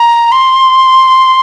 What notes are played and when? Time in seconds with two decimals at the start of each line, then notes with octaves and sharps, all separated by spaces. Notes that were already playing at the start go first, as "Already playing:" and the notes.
Already playing: A#5
0.32 C6